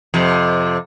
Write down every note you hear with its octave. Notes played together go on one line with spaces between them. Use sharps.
F2 C3